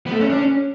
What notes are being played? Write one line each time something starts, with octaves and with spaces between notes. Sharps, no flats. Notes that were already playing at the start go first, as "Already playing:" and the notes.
B3
A3
C#4
D4
C#4